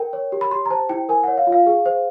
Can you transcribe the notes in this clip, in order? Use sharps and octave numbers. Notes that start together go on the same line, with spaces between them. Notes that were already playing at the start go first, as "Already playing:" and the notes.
Already playing: A#4 G5
C#5
G4
B5
G4 C6
A#5
C5 A5
E4 G5
A#4 G#5
C#5 F#5
F5
F4
F5
G#4
C5